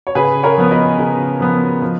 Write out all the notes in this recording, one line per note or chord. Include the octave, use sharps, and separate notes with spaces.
C#5
C#3 G#4 B4
A#4 C#5
F3 B3
B4 D#5
C#3
F3 B3
F3